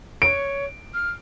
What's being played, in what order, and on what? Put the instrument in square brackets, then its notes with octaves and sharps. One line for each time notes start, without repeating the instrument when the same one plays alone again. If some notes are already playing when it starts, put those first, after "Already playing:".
[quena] C#5 [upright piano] D7
[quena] F6